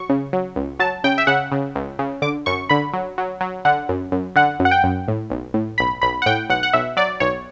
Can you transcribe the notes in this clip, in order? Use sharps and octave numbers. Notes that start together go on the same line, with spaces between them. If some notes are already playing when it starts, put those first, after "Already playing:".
Already playing: F#3 C#6
C#3
F#3
C#2
F#3 A5
C#3 G5
E5
C#3 F#5
C#3
C#2
C#3
D3 D6
F#2 C#6
D3 B5
F#3
F#3
F#3
D3 F#5
F#2
F#2
D3 F#5
F#2
F#5
G5
F#2
A2
B1
A2
B1 B5
B1 B5
F#5
A2 G5
B1 F#5
F#5
B1 E5
F#3 D5
B1 C#5